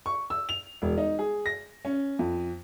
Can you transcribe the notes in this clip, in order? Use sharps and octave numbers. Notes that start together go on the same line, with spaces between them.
C#6
E6
F7
E1
D#4
G#4
A#6
C#4
F2